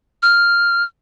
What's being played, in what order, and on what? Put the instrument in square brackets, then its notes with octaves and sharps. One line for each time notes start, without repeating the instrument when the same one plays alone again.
[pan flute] F6